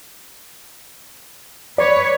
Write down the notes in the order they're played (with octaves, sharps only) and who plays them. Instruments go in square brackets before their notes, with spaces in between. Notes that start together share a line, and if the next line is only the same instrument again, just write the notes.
[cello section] B4 C#5 [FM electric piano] D5